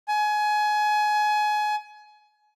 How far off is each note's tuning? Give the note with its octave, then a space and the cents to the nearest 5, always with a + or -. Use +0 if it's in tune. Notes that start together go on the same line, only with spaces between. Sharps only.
G#5 +25